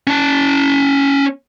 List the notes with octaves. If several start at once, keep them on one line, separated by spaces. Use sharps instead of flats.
C#4 A5